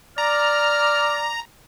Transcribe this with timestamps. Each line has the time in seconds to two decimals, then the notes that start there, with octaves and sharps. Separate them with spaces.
0.18 D5 A#5 F6